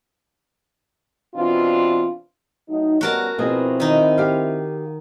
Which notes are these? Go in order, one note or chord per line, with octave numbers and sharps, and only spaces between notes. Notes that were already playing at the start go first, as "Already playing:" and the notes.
B2 E3 C4 D4 F4
A2 F#3 D#4
G3 B3 C#4 F#4 A#4 A5
B2 F3 C4 E4 G#4
D#3 D#4
G4 F5